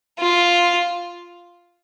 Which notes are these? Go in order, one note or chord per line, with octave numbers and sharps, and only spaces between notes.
F4